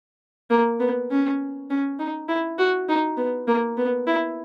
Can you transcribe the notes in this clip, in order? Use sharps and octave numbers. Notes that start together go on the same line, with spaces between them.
A#3
B3
C#4
C#4
D#4
E4
F#4
D#4
B3
A#3
B3
E4